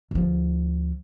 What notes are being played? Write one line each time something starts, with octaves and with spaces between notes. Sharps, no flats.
D2 F3